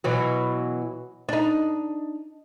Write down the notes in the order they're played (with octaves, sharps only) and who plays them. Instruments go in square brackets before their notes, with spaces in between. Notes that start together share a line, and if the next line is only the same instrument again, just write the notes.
[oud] B2 E3 F#3
D4 D#4